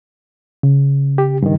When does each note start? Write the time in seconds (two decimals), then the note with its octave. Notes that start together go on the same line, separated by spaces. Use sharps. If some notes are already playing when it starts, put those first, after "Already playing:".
0.63 C#3
1.18 G4
1.42 G2 D#3